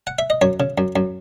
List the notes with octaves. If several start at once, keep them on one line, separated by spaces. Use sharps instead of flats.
F#5
E5
D#5
F#2 C#5
C#3
F#2
F#2